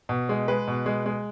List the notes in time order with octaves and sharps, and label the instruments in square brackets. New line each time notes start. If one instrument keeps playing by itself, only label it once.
[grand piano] B2
G#3
G#3 B4
B2
G#3
G#3